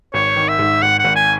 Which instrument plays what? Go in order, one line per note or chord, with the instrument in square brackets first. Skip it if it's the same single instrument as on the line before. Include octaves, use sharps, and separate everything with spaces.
[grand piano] G#1 [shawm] C#5
[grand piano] D#3
[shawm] E5
[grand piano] G#2
[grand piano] G#1 [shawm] F#5
[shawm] F#5
[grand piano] G#1
[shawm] G#5